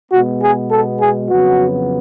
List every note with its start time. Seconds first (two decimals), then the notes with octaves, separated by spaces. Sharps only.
0.12 B2 G#3 B3 F#4
0.42 G#4
0.71 A4
1.00 G#4
1.30 F2 C#3 F#3 B3 F#4